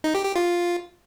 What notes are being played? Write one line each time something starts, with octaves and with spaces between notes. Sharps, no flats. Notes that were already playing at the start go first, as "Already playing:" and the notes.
D#4
G4
G4
F4